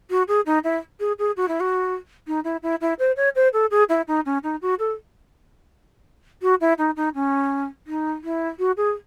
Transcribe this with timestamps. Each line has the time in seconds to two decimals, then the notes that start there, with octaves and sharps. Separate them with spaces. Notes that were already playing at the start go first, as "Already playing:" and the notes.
0.10 F#4
0.28 G#4
0.46 D#4
0.64 E4
1.00 G#4
1.19 G#4
1.37 F#4
1.48 E4
1.60 F#4
2.27 D#4
2.44 E4
2.63 E4
2.81 E4
2.99 C5
3.17 C#5
3.36 C5
3.53 A4
3.71 G#4
3.89 E4
4.08 D#4
4.26 C#4
4.43 D#4
4.62 F#4
4.79 A4
6.42 F#4
6.61 E4
6.78 D#4
6.96 D#4
7.15 C#4
7.87 D#4
8.24 E4
8.59 F#4
8.77 G#4